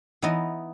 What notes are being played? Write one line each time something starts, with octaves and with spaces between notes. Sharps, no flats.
E3 B3 D#4 D#5